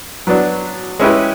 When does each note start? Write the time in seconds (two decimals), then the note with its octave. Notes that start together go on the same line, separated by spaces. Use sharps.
0.27 F#3 B3 D4
0.99 G#3 C#4 E4 G4 B4